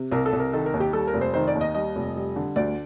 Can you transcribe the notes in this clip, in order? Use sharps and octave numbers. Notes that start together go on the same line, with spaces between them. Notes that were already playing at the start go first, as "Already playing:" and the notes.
Already playing: C3
C2 A#4
A4
C2
A#4
D#3 A4
A#4
D#2
G4
G3 A4
A#4
F1
C5
D#3 C5
D5
D#2
D#5
G3 D#5
F1
G3
D3
D2 D5